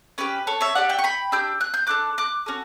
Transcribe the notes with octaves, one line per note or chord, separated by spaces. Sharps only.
C#4 G4 B4
A4 C#5
C#5 E5
D4 G4 D5 F#5
E5 G5
C#6
G5 B5
D4 G4 E6 G6
F#6
G6
D4 A4 D6 F#6
D6 F#6
C#4 F#4 A4